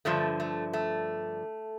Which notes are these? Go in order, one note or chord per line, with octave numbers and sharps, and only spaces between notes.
G2 D3 F3 A3
A3
A3